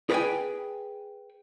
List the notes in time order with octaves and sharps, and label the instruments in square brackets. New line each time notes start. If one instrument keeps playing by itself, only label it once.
[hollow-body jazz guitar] G#4 B4 D5 F5 G5 G#5